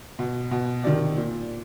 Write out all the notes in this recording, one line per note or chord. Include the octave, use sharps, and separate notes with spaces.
B2
B2
C3 D#3 D5
A#2